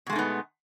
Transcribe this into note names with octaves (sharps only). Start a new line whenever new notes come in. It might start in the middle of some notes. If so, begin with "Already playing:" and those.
B2 G#3 A3 B3 D#4